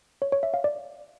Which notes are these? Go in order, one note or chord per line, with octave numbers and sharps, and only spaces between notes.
C#5
C#5
E5
F5
D5